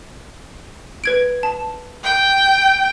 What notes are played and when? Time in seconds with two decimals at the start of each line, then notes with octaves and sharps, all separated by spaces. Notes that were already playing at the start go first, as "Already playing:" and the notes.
1.04 B4 G#6 D7
1.43 A5
2.04 G5